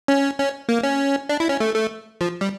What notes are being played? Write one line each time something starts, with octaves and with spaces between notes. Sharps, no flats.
C#4
C#4
A#3
C#4
D4
E4
C#4
A3
A3
F3
G3